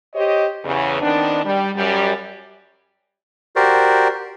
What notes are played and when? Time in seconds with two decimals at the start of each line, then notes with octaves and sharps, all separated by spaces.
0.14 G4 C5 C#5 D#5
0.65 E2 C#3
1.01 D#3 B3 C4 D4
1.45 G3
1.75 F#2 G3
3.56 F#4 G4 A#4 C5 D5